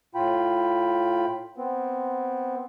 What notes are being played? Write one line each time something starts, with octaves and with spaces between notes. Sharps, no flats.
A2 F4 G5 B5
B3 C4